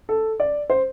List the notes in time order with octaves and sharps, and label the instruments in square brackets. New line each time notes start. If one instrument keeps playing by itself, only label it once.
[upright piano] A4
D5
C5